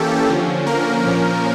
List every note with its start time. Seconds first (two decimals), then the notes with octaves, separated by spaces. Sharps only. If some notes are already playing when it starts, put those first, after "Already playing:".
Already playing: E3 A#3 C#4 G4 A4
0.27 D3 F3 C#4
0.66 A#3 A#4
1.06 A#2 F3 C#4